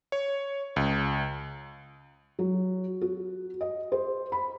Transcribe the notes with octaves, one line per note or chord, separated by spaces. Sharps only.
C#5
C#2
F#3
F#4
D#5
C5
B5